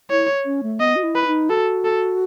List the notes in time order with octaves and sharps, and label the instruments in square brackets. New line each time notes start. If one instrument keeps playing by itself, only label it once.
[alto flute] E4 [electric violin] C#5
[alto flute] C#4
A3
[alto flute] B3 [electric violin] D#5
[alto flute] F#4
E4
[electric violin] B4
[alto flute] D#4
[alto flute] F#4 [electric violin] A4
[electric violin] A4